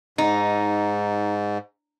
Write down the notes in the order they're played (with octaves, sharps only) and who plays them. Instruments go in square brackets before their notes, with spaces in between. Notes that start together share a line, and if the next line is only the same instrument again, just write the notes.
[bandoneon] G#2 [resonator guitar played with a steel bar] D#4